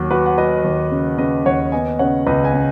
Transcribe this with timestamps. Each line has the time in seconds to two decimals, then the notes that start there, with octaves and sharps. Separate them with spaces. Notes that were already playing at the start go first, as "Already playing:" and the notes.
Already playing: D#2 F#3 F#4
0.11 F#3 F#4 B4
0.26 F#5
0.38 F#3 B4 D#5
0.64 D#2
0.91 C#3
1.18 C#3 B4 D#5
1.46 D#2 C#5 F#5
1.72 B3 D#5 G#5
1.99 C#3 C#5 F#5
2.26 C#2 B4 D#5
2.44 D#5 G#5
2.54 C#3